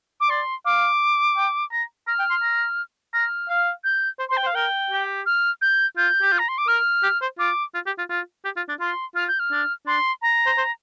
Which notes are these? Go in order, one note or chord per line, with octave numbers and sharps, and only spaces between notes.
D6
D5 C6
F5 D6
G5
A#5
A#5 F6
G5
C6
A#5
A#5 F6
F5
G6
C5
C6
C5
G5
C5
F5
A#4 G5
G4
F6
G6
F4 G6
G4
F4
A#5
C6
D6
A#4 F6
G4
C5
F4 D6
F4
G4
F4
F4
G4
F4
D4
F4 C6
F4 F6
G6
F6
D4
D4 C6
A#5
C5
C5